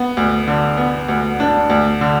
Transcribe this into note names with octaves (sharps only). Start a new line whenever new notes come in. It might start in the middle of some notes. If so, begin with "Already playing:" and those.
Already playing: B3
D2
D3
B3
D2
D4
D2
D3